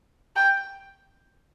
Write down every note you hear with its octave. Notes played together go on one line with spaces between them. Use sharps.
G5